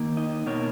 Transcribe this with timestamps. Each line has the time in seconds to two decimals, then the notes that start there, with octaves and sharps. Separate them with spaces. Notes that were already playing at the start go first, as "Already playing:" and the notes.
Already playing: D#3 A#3
0.17 D#4 D#5
0.46 B2 A#3 D#4 C#5